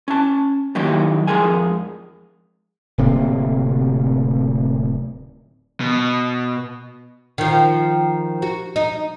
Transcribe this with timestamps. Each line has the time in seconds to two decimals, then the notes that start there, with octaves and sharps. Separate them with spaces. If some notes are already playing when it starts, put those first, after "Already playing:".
0.08 C#4 A5
0.75 D#3 E3 F#3 A#3 D#4 G4
1.27 F2 G#3 G#4 A#4 G#5
2.98 D1 C3 A#3
5.80 B2
7.38 D#3 F3
8.42 F#4
8.76 D#4